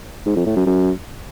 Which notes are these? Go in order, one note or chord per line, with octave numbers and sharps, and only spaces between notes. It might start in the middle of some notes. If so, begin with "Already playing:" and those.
G#2
F2
A2
F#2
F#2